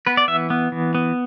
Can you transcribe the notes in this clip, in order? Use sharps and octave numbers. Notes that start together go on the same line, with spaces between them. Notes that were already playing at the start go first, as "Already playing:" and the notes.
B3 B4
D5
E3 E5
B3
E3
B3